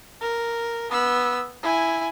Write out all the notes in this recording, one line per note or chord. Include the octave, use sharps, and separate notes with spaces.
A#4
B3 E6
E4 G#5